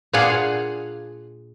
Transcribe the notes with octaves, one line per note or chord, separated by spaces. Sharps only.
A#2 D4 F4 G#4 F5 F#5